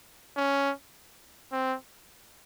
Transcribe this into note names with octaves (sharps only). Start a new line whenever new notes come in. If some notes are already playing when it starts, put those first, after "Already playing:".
C#4
C4